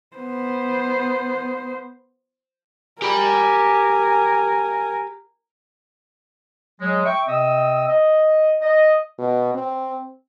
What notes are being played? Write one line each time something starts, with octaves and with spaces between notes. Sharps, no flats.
B3 C5
G4 A#4 G#5 B5
F#3 G#3
E5 G5 C#6
C3 C4 D#5 D#6 E6
D#5
D#5
B2
C4